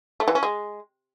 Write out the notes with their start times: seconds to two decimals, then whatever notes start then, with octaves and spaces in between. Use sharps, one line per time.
0.20 A3
0.28 E3
0.35 C#4
0.43 G#3